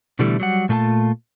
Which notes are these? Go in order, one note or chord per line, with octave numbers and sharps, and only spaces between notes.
B2 D3 E3 G3 A3 E4
F#3 G3 F#5
A#2 A3 F4 G#5 A5